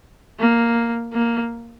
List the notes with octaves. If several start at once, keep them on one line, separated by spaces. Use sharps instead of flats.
A#3
A#3